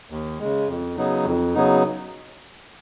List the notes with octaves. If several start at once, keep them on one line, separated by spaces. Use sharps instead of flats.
D#2
C#3 G#3
F2
C#3 F#3 B3 D#4
F2
C#3 F#3 B3 D#4